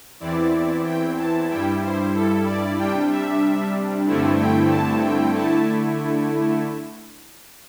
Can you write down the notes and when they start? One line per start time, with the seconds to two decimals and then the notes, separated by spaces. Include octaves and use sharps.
0.20 E2 E3 C4 E4 D5
0.84 G5
1.17 A5
1.49 G2 G3 E4 G5
1.81 C5
2.14 A4
2.45 D5
2.77 C3 G3 D4 G5
3.10 E5
4.06 G2 D3 A3 C4 E4
4.38 G5
4.70 A5
5.02 G5
5.35 D3 A3 E4 A5